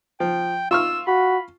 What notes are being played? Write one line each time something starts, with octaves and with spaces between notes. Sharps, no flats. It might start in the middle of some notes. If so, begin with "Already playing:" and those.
F3 G5
F4 C#6 E6 F6
F#4 B5